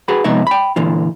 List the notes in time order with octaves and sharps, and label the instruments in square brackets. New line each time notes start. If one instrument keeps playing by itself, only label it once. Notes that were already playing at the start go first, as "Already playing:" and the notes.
[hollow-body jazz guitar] F#4 G#4 B4 B5
F2 C3 G#3 B3 D#4 E5
G5 B5
A#2 D3 E3 F4